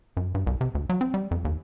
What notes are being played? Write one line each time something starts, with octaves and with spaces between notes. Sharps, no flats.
F#2
G2
C2
C3
D2
F#3
C4
G3
F2
D#2